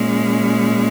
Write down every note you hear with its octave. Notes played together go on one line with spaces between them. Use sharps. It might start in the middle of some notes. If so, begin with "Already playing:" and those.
Already playing: A#2 G#3 C#4